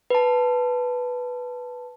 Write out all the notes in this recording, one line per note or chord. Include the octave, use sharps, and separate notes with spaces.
B4 A5